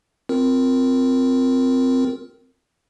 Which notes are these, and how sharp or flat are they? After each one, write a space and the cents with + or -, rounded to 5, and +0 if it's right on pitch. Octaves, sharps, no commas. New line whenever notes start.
C4 -10 F4 +0 A#4 +0